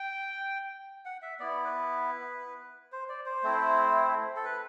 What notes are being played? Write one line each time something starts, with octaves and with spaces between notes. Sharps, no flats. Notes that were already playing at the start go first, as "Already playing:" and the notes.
Already playing: G5
F#5
E5
B3 E4 D5
B4
C5
D5
C5
A3 C4 E4
A4
B4